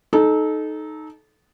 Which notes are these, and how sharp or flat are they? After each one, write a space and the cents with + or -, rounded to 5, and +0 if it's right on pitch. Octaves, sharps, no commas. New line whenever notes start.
D#4 -5 A4 -25